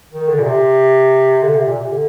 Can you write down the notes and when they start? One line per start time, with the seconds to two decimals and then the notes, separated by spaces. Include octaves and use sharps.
0.12 D#3
0.28 D3
0.39 A#2
0.45 C3
1.43 D3
1.55 C3
1.67 A#2
1.79 C3
1.91 D3